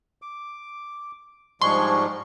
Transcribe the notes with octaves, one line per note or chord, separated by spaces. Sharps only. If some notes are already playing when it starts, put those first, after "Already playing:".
D6
G#2 F3 G3 G#3 D4 G#4 C6 C#6